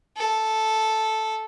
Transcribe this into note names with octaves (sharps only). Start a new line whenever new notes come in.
A4